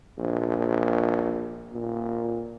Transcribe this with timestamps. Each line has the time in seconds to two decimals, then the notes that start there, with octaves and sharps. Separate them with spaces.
0.18 A#1
1.73 A#2